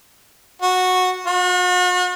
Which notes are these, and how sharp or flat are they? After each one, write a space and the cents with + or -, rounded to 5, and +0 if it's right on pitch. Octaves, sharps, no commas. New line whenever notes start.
F#4 -10
F#4 -40